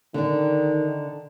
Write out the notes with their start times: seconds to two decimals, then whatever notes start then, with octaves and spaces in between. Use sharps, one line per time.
0.14 D3 D#3 D4